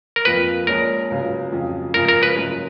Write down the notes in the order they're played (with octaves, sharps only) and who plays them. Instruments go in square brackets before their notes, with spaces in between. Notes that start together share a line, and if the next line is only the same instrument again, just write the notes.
[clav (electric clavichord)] A#4
[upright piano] F2 F3 A#3 F4 [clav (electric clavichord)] B4
[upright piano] A#1 A#2 G#3 C#4 [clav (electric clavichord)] A#4
[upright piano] C#2 C#3 F#3
F2 C#3 F#3
[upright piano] F#1 F#2 C#3 F3 G#3 [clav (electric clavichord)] A#4
[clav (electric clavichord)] A#4
B4
[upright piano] F#1 F#2 C#3 F3